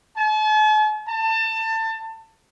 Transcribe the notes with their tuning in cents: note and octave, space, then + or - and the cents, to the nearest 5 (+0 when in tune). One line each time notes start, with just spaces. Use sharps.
A5 -45
A5 +25